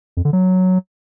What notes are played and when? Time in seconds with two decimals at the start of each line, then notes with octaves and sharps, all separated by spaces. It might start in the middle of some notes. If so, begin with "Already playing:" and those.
0.17 F2
0.25 D3
0.33 F#3